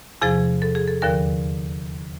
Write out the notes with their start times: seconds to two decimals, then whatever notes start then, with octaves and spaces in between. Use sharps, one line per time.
0.22 E2 C3 F3 G#4
0.62 A4
0.75 G#4
0.88 A4
1.02 D#2 D3 F3 A#4